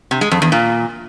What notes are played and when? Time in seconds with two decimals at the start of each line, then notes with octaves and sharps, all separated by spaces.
0.11 C3
0.21 G#3
0.31 F2
0.42 E2
0.52 A#2